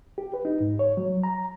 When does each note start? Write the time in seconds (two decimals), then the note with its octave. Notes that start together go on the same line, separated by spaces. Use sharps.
0.18 G4
0.34 B4
0.45 D#4
0.60 G#2
0.79 C#5
0.97 F#3
1.24 A#5